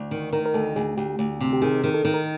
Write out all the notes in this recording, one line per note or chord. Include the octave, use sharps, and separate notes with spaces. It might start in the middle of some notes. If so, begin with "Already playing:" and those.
Already playing: D2
D#3
D#3 A#4
A#4
D2 A4
D2 G#4
D2 G4
D2
C3
G4
D#3 G#4
D#3
A4
D#3
A#4